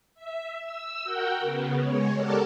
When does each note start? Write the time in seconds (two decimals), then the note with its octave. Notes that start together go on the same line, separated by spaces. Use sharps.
0.14 E5
0.57 E6
1.04 F#4 A#4 F#5 G5
1.40 C#3 B3
1.80 G#3 C#5
2.15 G4 A4 A#4 D5 F#5 A5